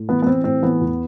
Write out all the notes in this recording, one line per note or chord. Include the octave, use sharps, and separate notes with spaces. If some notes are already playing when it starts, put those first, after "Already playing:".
Already playing: A2
E3 B3
B3
E3 C4
A2 C4
E3 B3
E2